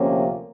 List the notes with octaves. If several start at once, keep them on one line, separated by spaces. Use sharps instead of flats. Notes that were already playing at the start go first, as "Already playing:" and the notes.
Already playing: D2 C3 F3 A#3 C#4